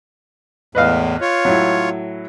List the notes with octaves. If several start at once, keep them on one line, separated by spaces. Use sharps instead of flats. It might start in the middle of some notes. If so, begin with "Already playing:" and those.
E2 A2 B4 D#5 F5
F4 C#5
A2 F#3